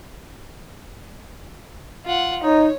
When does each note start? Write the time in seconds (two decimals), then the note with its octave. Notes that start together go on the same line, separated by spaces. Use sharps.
2.05 F4 F#5
2.43 D#4 C#5